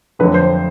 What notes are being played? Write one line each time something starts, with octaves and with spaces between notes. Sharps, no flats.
F2 D3 F#3 A3 B4
C5